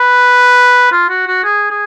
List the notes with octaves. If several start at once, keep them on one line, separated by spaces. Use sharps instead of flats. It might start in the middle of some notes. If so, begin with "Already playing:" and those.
Already playing: B4
F4
F#4
F#4
G#4
G#4